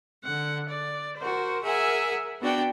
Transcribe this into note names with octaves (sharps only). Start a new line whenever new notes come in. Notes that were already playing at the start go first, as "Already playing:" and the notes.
D3 F#5
D5
F#4 A#4 C5
G#4 A#4 E5 F#5 G#5
B3 D4 F#4 D5 G5